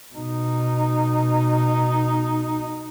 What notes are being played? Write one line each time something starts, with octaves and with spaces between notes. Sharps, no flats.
B2 D#4